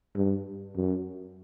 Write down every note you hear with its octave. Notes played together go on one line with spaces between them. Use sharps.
G2
F#2